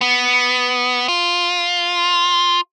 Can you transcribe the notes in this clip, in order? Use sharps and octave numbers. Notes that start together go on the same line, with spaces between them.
B3
F4